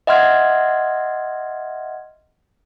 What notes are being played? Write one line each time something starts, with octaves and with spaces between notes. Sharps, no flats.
D#5 E5 F#5 C6 F6 G#6